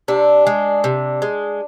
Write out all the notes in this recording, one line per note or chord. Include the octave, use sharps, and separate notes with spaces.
C3 D4
G#3
C3
G#3